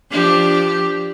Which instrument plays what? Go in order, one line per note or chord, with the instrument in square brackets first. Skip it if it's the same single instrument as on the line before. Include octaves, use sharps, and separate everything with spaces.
[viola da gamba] F3 D4 G4